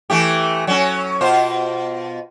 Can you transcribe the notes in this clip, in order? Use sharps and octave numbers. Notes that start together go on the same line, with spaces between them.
E3 A3 G4
F#3 C#4
B2 F4 C5